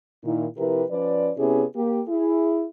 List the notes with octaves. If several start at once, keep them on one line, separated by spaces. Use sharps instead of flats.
A#2 D#3 E4
C3 F3 E4 G4 A#4 B4
F3 C#4 B4 D5
C3 B3 C#4 E4 G4 G#4
A#3 G4
E4 G#4